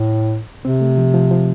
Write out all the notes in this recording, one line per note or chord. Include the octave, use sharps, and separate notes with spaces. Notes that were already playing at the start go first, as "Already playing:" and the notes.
Already playing: A2
C3 C4
A3
F3
F3
F3